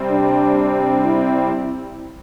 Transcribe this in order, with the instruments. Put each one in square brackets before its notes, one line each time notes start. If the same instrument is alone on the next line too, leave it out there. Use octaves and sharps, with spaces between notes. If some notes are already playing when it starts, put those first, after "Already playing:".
Already playing: [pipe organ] C3 G3 C4
[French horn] D4
E4